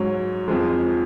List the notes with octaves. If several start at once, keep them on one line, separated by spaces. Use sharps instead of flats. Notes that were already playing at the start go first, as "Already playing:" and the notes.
Already playing: G#2 F#3 C#4
F2 F3 G#3